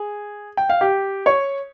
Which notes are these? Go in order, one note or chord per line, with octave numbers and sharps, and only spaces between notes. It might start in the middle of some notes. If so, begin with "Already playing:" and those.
Already playing: G#4
G5
F5
G4 G5
C#5 C#6